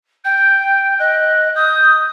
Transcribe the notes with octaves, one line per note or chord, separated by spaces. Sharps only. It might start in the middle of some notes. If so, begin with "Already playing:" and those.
G5 G6
D#5 F#6
D#6 G6